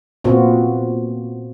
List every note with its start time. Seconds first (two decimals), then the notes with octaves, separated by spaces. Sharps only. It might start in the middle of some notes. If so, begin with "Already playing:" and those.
0.24 A#2 B3 C4 F4 F#4